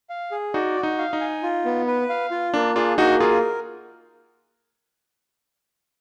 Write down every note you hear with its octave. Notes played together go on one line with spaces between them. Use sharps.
F5
G#4
D#4 F#4 D5
F#4
D#4
F5
D#4
G#5
F4
B3
B4
F5
F4
A#3 D4
D4 F4 G#4
A#3 D#4 F#4
F4 G#4 A#4